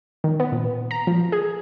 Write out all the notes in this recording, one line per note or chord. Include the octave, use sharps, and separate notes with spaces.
D#3
B3
A#2
A#5
F3
G#4